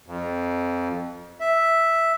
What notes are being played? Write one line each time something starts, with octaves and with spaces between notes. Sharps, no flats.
F2
E5